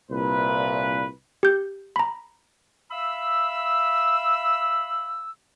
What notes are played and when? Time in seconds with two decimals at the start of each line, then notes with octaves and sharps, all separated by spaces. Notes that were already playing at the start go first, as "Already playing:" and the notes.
0.11 C2 A#2 B4
1.43 G4 G6
1.96 A#5 B5
2.92 E5 F5 B5 E6